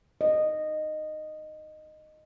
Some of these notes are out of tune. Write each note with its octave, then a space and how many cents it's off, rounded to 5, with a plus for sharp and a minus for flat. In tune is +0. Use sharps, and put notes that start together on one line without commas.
D#5 -15